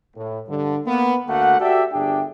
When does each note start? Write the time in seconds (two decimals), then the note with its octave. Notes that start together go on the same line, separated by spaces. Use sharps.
0.16 A2
0.47 G2 D3
0.86 A#3 B3
1.28 D2 A3 A#3 F#4 F#5
1.60 F#4 G4 A4 D5 E5 G5
1.92 G1 D4 G4 G#4 E5 G5